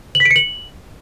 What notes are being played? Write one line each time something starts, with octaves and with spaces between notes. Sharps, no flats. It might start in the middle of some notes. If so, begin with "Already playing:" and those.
F#7
B6
D7
C#7
F#7